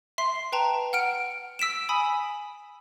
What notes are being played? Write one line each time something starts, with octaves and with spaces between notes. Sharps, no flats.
E5 C6 C7
B4 G5 A5 A#5
F#5 F6 D7
E6 B6 D7 E7
G#5 B5 D#6